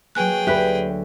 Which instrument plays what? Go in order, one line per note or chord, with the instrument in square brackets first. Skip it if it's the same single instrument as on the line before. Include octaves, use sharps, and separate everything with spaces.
[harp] F#3 A#3 [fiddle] G#4 G5 [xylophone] B4 G#5 F#6
[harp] D2 [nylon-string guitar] G4 B4 [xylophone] E5 F#6 B6